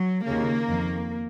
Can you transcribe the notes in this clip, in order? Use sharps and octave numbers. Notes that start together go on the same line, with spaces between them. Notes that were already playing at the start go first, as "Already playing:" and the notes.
Already playing: F#3
D#2 C#3 A#3
F2 D#3